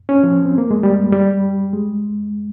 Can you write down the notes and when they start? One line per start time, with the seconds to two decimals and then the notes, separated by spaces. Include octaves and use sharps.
0.09 C#4
0.23 F3
0.45 C4
0.58 A#3
0.71 G#3
0.83 G3
1.13 G3
1.73 G#3